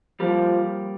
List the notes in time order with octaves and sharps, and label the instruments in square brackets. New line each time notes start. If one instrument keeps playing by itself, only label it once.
[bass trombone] F3 [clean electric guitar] G3 A#3